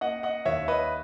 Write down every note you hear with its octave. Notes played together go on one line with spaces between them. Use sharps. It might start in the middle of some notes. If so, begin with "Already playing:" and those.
A#3 D#5 F#5
D#5 F#5
D#2 C#5 E5
B4 D#5